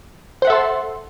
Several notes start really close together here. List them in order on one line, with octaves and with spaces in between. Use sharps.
C5 F#5 E5 A4 C6